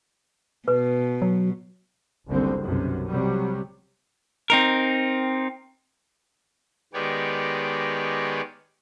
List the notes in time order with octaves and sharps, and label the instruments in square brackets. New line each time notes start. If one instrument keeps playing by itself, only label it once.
[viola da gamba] B2 [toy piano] B4
[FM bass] F#3
[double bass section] F#1 C2 D3 C4
B1 F#2 C3
C3 F#3 G3
[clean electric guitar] C4 D#4 A#4
[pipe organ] D#3 G#3 B3 G4 C#5 D5